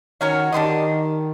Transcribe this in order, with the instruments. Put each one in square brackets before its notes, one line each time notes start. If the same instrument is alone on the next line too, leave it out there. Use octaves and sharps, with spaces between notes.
[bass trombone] D#3 [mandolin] C#4 F#4 A#4 C#5
[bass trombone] D#3 [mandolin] D4 G4 C5 D#5